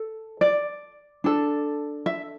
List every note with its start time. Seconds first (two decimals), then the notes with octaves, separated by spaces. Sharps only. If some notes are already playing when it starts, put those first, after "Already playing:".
Already playing: A4
0.41 D5
1.24 D4 A4
2.06 E5